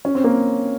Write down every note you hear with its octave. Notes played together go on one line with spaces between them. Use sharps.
C#4
C4
A#3